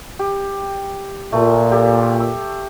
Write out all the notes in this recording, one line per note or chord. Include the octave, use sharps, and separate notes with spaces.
G4
A#2 A3
G4 A4
E6